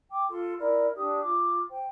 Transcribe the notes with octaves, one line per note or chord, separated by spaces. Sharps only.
G5 D6
F4 A4 C6
D#4 E4 A#4 D5
D4 G4 D#6
F4 D6
C5 G5